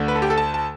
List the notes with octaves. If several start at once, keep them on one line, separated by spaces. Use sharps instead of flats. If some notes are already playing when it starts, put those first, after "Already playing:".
Already playing: D2 D3 A3
B4
A4
G4
A4
A5
A5